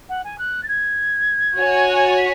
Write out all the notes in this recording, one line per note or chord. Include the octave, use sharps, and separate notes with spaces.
F#5
G#5
F#6
A6
G#6
F#4 C#5 G#5
F#6
G#6
A6
B6